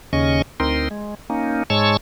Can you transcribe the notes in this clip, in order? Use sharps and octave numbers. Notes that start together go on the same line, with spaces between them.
D#2 C#3 C#4 D#5 C#6
D2 C4 D#4 A#4 C6
G#3
A#3 C#4 D#4
G#2 G#3 C#5 A5 C#6 E6